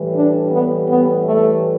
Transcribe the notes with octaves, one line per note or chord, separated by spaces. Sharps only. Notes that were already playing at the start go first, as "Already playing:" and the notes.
Already playing: A2 E3 G3
D4
B3
B3
A3